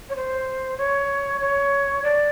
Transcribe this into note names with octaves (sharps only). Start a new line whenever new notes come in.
C#5
C5
C#5
C#5
D5